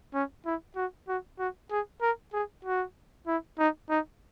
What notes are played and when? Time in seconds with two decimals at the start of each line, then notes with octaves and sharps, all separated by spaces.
0.14 C#4
0.45 E4
0.76 F#4
1.08 F#4
1.39 F#4
1.71 G#4
2.01 A#4
2.33 G#4
2.65 F#4
3.27 E4
3.59 D#4
3.90 D#4